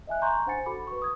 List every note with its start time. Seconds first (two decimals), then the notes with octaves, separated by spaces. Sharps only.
0.07 D#5 E5 G#5 F#6
0.21 F#5 G#5 A#5 C6 C#6 G6
0.46 D4 C5 F#5 G#5 A6 C#7
0.66 F#4 A4 B5 D6
0.87 B4 C#6
1.02 D#6 G#6